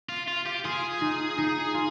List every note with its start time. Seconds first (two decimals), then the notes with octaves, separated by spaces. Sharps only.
0.09 F4
0.28 F4
0.45 G4
0.65 F4 G#4
1.01 D#4
1.38 D#4
1.74 F4